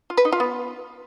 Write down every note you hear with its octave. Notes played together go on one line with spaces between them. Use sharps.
F4
B4
D#4
F4
B3